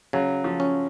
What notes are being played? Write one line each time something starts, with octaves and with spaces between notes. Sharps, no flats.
C#3 F#3
F3
C#4